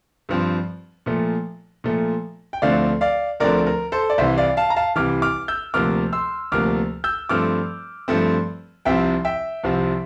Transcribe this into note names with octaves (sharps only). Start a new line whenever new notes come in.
G2 F3 C4
A#2 F3 A3
A#2 F3 A3
G5
D2 D3 F3 A3 C4 D5 F5
D5 F5
D2 D3 F3 A3 C4 A#4 D5
A#4
A4 C5
D5
C2 C3 E3 C5 E5
D5 F5
F5 A5
A#5
F5 A5
C2 C3 E3 D6 F6
D6 F6
E6 G6
D2 C3 F3 A#3 D6 F6
C6 E6
D2 C3 F3 A#3 D6 F6
E6 G6
G2 F3 A3 C4 D6 F6
G2 F3 A3 C4
C2 C3 F3 C4 E5 G5
E5 G5
C2 C3 F3 C4